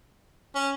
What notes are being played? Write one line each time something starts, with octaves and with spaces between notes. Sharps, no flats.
C#4